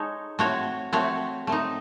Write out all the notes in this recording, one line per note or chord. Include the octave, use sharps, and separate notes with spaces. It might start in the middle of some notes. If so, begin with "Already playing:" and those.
Already playing: G#3 D#4 A4 C#5
A3 C4 F#4 C#5
A3 C4 F#4 C#5
A3 C4 D#4